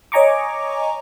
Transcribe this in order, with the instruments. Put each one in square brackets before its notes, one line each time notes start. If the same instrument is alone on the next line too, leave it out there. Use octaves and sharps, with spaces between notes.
[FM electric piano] C#5 D#5 G#5 A#5 C#6 D6